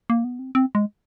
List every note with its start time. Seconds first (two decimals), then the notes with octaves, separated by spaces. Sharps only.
0.10 A#3
0.24 B3
0.39 C4
0.55 C4
0.75 G#3